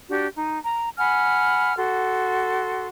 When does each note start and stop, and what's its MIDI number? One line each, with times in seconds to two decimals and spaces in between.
0.09 0.26 62
0.09 0.26 66
0.09 0.26 67
0.36 0.57 63
0.64 0.90 82
0.98 1.75 78
0.98 1.75 80
0.98 1.75 83
0.98 1.75 89
1.76 2.88 66
1.76 2.88 69
1.76 2.88 84